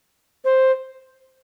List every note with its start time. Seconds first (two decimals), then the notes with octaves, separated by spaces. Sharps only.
0.45 C5